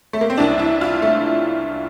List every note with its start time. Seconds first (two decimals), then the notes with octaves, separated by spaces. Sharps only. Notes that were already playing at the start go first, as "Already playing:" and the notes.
0.13 A3
0.21 A#3
0.30 C4
0.37 C2 C3 E3 D4
0.59 E4
0.81 F4
1.02 A3